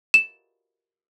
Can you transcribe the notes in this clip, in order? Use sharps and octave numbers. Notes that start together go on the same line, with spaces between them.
E7